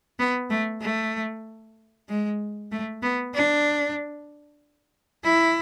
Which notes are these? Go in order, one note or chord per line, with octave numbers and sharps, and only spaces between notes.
B3
A3
A3
G#3
A3
B3
D4
E4